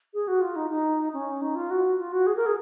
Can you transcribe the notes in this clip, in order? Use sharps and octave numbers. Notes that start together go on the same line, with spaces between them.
G#4
F#4
F4
D#4
D#4
C#4
D#4
F4
F#4
F4
F#4
G#4
A#4
G#4